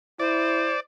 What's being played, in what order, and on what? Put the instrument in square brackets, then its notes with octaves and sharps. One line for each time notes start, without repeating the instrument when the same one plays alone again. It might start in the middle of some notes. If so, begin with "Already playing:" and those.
[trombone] E4 [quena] C5 [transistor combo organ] D5